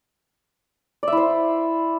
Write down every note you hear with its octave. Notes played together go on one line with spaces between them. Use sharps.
E4 C5 D5 E5